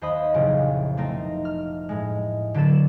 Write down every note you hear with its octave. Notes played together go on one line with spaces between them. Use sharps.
D#2 C5 D#5 B5 D#6
F1 B1 A#2 C#3 E3 C4
A3 C4 D#4 A#4
F6
A2 G#3
D3 F#3 B3 A4 E7